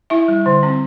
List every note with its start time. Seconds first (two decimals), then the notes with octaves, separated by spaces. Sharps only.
0.10 E4 E5
0.28 G3
0.46 D3
0.63 C4